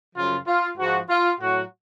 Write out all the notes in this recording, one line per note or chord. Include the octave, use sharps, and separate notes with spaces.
F#2 C#3 F3 F4
F4
G#2 F3 F#4
F4
A2 F#3 F#4